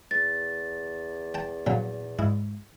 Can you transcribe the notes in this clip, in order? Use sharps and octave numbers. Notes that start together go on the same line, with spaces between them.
E2 A6
G5 A5
A#2 D3 F#3
G#2 E4